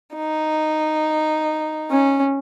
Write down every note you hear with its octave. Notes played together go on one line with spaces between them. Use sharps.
D#4
C#4